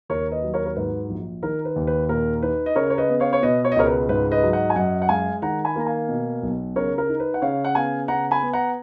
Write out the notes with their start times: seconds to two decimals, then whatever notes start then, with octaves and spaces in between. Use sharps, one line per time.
0.09 D#2 A#4 C#5
0.32 B4 D#5
0.43 F#3
0.54 A#4 C#5
0.66 A#4
0.76 G#2 B4
1.09 A#1
1.42 D#3 A#4
1.65 B4
1.76 D#2
1.87 B4
2.09 A#2 A#4
2.42 D#4 B4
2.66 D#5
2.76 C#3 A#4 C#5
2.90 C#5
2.98 B4 D#5
3.09 B3
3.20 C#5 F5
3.33 C#5
3.42 B2 B4 D#5
3.65 C#5
3.72 D#5
3.76 C#2 A#4 C#5
3.87 B4
4.09 G#2 B4
4.31 B4 D#5
4.42 F#3
4.53 D#5 F#5
4.70 G#5
4.75 F#2 D#5 F#5
5.02 F#5
5.09 G#3 F5 G#5
5.42 D#3 F#5 A#5
5.65 G#5 B5
5.76 A#3 A#5
5.86 F5 G#5
6.09 B2
6.43 B1
6.76 C#3 A#4 C#5
6.98 A#4
7.09 D#4
7.20 B4
7.34 F#5
7.42 C#3 C#5 F5
7.65 F#5
7.75 B3 F5 G#5
8.08 C#3 F#5 A#5
8.31 G#5 B5
8.42 B3
8.53 F#5 A#5